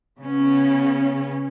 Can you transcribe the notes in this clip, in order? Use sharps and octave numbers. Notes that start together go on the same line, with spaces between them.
C#3 B3 C#4